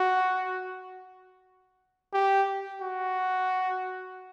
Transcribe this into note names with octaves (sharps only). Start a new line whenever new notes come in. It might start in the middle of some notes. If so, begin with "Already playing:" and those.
Already playing: F#4
G4
F#4